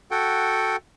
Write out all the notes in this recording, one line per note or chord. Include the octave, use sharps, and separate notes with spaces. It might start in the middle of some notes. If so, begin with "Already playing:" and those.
F#4 A4 F#5 G5